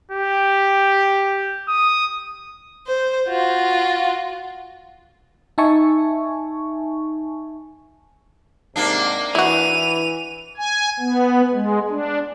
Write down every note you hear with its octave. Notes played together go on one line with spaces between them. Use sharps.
G4
D#6
C5
F4 F#4
D#4 E5 G#5 A5 C#6
G#2 C3 A#3 D4
E3 E4 F#4 D#7 F7
G#5
B3
G#3
D4